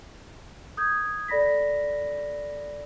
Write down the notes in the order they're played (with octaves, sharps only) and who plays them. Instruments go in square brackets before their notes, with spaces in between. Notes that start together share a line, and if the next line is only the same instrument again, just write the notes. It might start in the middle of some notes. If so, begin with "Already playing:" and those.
[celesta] D#6 G6 G#6
A4 D5 B5 A#6 B6